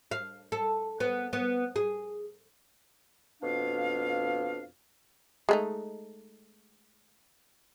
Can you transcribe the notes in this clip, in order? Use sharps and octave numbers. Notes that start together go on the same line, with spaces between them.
F5
A4
B3
B3
G#4
F2 B2 D4 F5
G#3 A3 D#4